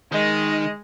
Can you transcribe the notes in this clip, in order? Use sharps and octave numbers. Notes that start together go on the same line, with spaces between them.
D#3 G#3 D#5